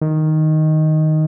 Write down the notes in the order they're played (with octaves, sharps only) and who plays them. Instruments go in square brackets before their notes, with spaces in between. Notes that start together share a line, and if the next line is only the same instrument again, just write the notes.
[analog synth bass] D#3